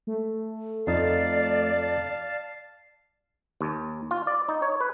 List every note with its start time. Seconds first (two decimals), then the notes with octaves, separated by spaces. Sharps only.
0.07 A3
0.87 F2 D#4 D5 F5 A5
3.61 D#2
4.11 F4
4.27 D5
4.49 D#4
4.62 C#5
4.81 B4